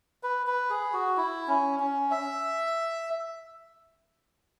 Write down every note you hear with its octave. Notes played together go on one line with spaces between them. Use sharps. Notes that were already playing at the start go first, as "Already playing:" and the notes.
B4
B4
G#4
F#4
E4
C#4
C#4
E5